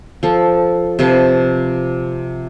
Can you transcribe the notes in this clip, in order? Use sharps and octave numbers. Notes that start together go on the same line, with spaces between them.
F3 A4
C3 F3 B4 A5